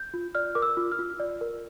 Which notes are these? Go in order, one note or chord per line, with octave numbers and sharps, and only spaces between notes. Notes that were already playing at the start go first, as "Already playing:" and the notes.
Already playing: G6
F4
D5 F6
A#4 D6
E6
F4
F6
F4
D5
A#4